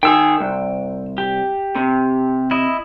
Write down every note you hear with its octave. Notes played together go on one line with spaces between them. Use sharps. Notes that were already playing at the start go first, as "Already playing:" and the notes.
D#3 G#4 G5 E6
C2
G4
C3
E4 D#5